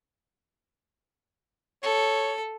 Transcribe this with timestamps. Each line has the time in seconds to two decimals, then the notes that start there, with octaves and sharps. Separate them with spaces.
1.83 A4 C#5